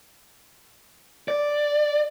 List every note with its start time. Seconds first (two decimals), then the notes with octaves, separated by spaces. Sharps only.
1.28 D5